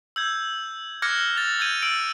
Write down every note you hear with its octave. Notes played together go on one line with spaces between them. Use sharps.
E6 G6 G#6
D6 F6 F#6 G#6 A#6 C#7
A6 F7
E6 G6 G#6 D#7
E6 A6 D7